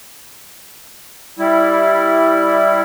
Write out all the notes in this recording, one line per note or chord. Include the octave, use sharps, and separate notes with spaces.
G3 E4